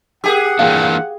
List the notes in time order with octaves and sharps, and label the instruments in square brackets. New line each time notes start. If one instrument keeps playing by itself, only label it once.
[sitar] G4 G#4 [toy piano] A#4 G5 E6 [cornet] F#5
[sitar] A#2 [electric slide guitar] E3 A#3 D4 [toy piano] F5 G5